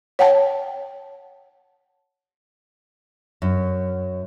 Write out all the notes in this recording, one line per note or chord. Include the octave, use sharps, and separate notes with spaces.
C#5 F#5 G5 A5
F#2